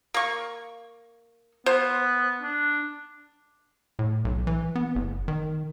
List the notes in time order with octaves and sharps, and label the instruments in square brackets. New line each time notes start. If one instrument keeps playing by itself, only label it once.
[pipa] A#3 C#6
[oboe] B3 [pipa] C5
[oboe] D4
[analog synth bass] A2
B1
E3
B3
F#1
D#3